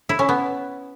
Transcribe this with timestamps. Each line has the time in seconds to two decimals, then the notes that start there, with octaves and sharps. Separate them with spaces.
0.09 E4
0.19 C#4
0.29 B3